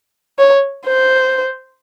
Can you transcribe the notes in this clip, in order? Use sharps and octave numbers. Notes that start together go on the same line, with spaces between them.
C#5
C5